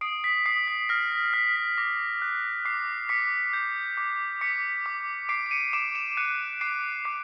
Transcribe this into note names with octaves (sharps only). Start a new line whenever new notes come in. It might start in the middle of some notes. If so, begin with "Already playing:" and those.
D#6 C7 D7
B6
D#6 C7
B6
F6 A#6
B6
F6 B6
B6
D6 A#6
F#6
D6 C7
D6 B6 C#7
G6
D6
D6 B6 C#7
D6
D6 C7 D7
D7
C#7 D#7
D6 D7 E7
D7 E7
E7
F#6 C#7 D#7
D6 C7 D7
D6 C7